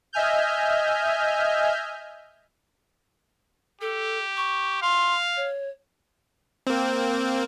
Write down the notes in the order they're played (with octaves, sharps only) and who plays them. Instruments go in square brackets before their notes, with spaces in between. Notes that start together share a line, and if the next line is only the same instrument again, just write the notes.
[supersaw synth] D#5 E5 G#5 F6 G6
[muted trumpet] G4 [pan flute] A4
[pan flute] C#6
[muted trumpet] F5 [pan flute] C6
[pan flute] C#5
[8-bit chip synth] A#3 C4